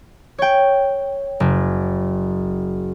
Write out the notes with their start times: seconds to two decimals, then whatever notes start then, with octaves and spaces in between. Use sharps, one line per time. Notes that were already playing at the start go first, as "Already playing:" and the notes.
0.38 C#5 G5
1.40 F#1